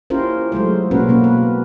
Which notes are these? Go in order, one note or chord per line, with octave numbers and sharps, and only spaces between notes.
C#4 E4 F4 G4 A#4 C5
F#3 G#3 A3 C5
B2 A#3 C#4 F#4 A#4 B4
B2 A#3 C#4
B4